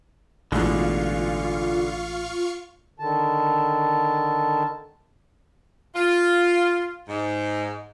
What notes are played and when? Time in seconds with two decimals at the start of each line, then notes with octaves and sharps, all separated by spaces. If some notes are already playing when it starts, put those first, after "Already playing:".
0.52 A1 B2 D3 G#3 F4 F5 C#6
3.00 D3 D#3 A5
5.94 F4
7.07 G#2